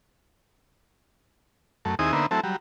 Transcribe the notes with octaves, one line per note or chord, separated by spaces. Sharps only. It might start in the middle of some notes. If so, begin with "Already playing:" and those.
F#2 A3
D#2 C4 D#4 E4 G#4 D#6
D3 A#3 B3 D#4 C5 E5
F#3 A3 C4 E4 A4
F#3 G3